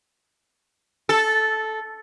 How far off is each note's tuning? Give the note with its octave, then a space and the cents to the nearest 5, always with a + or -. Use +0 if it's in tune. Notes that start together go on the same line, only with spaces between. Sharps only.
A4 -10